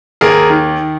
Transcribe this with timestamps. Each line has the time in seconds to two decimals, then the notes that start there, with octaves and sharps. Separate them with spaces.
0.21 D#2 G#4 A#4
0.50 D#3